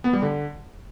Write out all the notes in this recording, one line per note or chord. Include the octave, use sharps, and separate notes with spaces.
B3
G3
D3